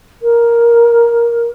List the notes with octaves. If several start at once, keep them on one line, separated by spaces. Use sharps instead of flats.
A#4